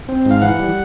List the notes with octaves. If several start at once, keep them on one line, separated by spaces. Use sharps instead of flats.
C4
G#2
F5
E3 F#5
G3